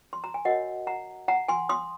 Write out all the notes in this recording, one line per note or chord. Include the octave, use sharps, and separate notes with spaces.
C6
A#5
G#5
F#4 A#4 C#5 D#5 F#5
F#5 A#5
F#5 A#5
G#5 C6
C6 D#6